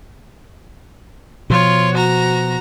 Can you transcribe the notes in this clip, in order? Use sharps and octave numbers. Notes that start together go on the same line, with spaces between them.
B2 F3 F4 C#5
F#4 A#5